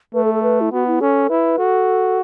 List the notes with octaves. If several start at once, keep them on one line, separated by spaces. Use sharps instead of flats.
A3 B4
A4
A4
B4
E4
B3 F#4
E4
C#4 A4
E4 B4
F#4 A4